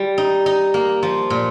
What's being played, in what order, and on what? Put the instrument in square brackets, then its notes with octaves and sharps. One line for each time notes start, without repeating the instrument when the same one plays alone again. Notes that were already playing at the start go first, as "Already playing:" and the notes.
Already playing: [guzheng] G3
D#4
D#4
A#3
F3
A#2